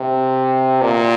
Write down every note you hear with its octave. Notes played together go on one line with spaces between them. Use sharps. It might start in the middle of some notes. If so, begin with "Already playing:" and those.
Already playing: C3
A#2